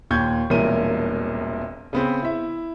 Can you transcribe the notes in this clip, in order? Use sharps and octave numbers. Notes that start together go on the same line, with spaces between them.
D#2 A#2 C#6 G6 G#6
E1 C2 A#2 C#4 A#4 D#7
C#3 B3 C4
E4 E5